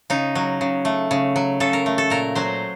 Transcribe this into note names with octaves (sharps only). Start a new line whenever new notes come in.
C#3 D#4
F#3
C#3
A3
C#3
F#3
C#3 A4
A#4
A3
A4
A#2 A#4
F#3 C5